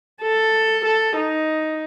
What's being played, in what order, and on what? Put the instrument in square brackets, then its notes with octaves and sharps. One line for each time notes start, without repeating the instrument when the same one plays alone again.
[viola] A4
A4
D#4